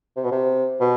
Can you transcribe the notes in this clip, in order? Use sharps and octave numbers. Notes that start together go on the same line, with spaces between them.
C3
B2
C3
B2